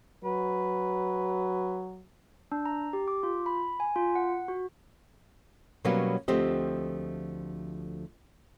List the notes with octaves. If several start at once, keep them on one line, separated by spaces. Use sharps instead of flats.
F#3 B4
D4
A#5
G4
D6
F4
B5
G#5
F4
F#5
F#4
B2 F#3 G3 A#3 B3 C#4
D2 F3 A3 C4 G4 D#5